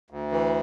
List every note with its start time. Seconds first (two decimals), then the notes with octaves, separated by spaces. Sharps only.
0.10 D2
0.32 E3